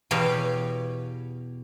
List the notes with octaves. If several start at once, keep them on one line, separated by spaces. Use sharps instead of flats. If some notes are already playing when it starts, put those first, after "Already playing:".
E2 B2 G4 C#5 F5